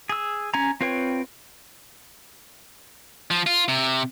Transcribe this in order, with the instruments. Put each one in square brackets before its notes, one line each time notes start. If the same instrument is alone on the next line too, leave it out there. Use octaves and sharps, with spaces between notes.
[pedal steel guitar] G#4 E6
C#4 G#5 A#5
C4 F4 B4 C#5 G5
[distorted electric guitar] F3
F4
C3